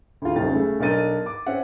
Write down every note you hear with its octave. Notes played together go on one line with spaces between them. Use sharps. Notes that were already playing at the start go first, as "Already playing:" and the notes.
D2 F4
D#1 F#2 C3 D#3 F5 A6
C#3 A3
B1 D4 A#4 D#5 A6 D#7
D6
C4 C#4 E5 F#5